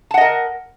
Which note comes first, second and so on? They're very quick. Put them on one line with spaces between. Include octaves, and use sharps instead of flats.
A5 F#5 D#5 A#4